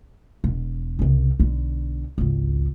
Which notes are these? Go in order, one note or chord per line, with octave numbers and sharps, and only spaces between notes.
E1
C2 C#3
B1 D3
G#1 C#2